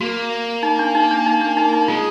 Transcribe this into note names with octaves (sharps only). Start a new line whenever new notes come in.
A#3 F#4
D#4
D4
D#4
D4
D#4
D4
D#4
D#4
G#3 F4